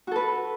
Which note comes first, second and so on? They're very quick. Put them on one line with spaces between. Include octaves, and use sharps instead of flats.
F#4 A4 B4